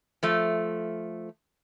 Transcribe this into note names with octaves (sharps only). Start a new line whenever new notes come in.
F3 A3